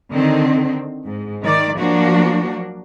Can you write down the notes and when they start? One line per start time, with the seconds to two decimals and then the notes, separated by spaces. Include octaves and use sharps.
0.12 D3 D#3 C4
1.05 G#2
1.43 D#3 D5
1.78 F3 F#3 A#3 D4 F#4